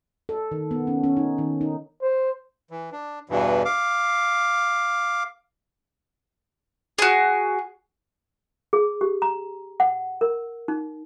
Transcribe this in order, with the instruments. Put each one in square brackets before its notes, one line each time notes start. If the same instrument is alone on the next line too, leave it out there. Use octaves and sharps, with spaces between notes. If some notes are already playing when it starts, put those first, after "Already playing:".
[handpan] A4
D#3
B3
C#4
C#4
D#4
D#3
D#4
[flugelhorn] C5
[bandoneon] E3
D4
E2 G2 B2 E3
F5 D6
[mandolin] F#4 G#4
[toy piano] G#4
G4
A#5
F#5
A#4
D#4